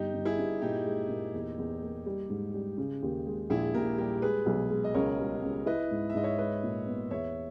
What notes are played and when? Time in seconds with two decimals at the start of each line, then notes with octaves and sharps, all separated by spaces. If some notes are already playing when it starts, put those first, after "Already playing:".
Already playing: G1 D#4 G4
0.13 G1
0.25 E4 G#4
0.38 G2
0.61 A#2 D#4 G4
0.85 G#3
1.09 A#2
1.34 E2
1.58 E2
1.82 A#3
2.06 G3
2.29 G#2
2.54 G3
2.77 C#3
3.02 D#2
3.26 G#3
3.50 A#1 E4 G#4
3.74 A#2 G4 A#4
3.98 G3 G4 A#4
4.22 G#3 G#4 B4
4.46 B1
4.70 G#3
4.84 D#5
4.94 C#2 A#4 C#5
5.19 G3
5.43 C#2
5.66 E4 B4 D#5
5.91 G#2
6.10 E5
6.14 G#2 D#5
6.24 C#5 E5
6.38 G#3 B4 D#5
6.63 A#2
6.87 B3
7.11 E2 C#5 E5